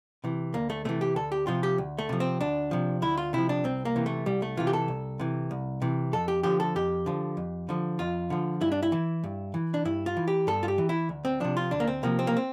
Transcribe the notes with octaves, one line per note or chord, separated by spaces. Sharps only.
C3 E3
D2 A#3
A3
C3 E3 A3
G4
D2 A4
G4
C3 F3 F4
G4
D2
A3
C3 F3
C4
D2 D4
C3 F3
D2 E4
F4
C3 F3 E4
D4
C2 C4
A#3
C3 E3
A3
C2 G3
A3
C3 E3 F4
G4
A4
C2
C3 E3
C2
C3 E3
F2 A4
G4
D3 F3 G4
A4
F2 G4
D3 F3
F2
D3 F3
F2 F4
D3 F3
G2 E4
D4
E4
E3
G2
E3
D4
G2 E4
F4
E3
G4
G2 A4
F4
G4
E3
E4
D2
C4
C3 F3 D4
F4
D2 D4
A#3
C4
C3 F3 A#3
C4
A#3
C4